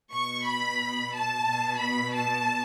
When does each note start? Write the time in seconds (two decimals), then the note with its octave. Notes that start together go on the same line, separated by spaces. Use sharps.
0.13 B2 C#6
0.47 B5
1.13 A5
1.47 B2
1.80 B5
2.14 A5